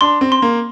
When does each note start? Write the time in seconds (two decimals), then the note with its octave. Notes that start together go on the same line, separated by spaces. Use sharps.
0.01 D4 C6
0.21 C4
0.32 C6
0.42 A#3